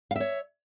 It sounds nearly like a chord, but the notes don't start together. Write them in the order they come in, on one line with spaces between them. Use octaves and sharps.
F5 E5 C#5